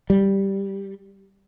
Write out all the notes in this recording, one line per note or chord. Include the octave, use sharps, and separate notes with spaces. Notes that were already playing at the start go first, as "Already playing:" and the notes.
G3